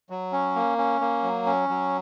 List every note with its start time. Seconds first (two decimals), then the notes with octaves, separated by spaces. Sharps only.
0.10 F#3
0.33 C#4
0.55 A#3
0.78 C#4
1.01 A#3
1.23 F#3
1.46 C#4
1.69 F#3